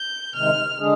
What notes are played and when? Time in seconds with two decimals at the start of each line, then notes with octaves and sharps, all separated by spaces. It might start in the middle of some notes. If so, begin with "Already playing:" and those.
Already playing: G6
0.35 C3 D#3 G#3 F6
0.79 D3 G#3 D4 G#4